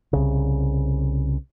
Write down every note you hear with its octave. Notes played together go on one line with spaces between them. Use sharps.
C2 C#3